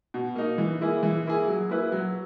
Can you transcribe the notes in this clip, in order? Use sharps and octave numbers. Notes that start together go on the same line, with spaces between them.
B2
A#3 D#4
E3
A#3 E4 G#4
E3
A#3 E4 G#4
F#3
A#3 E4 B4
F#3